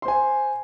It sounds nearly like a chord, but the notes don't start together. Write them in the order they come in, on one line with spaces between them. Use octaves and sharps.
C6 C5 G#5